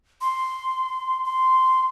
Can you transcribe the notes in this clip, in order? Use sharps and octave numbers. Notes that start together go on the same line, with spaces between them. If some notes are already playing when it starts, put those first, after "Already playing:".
C6
C6